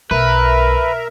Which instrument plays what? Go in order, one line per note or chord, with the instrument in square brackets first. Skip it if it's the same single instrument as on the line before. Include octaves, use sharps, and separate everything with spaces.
[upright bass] B1 [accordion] A#4 E5 A#5 [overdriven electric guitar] B4